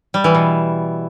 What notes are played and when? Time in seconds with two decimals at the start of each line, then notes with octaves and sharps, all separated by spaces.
0.14 G3
0.24 E3
0.34 B2